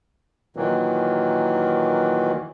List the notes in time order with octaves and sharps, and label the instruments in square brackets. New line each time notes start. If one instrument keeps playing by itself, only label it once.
[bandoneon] A#2 D#3 E3 F#3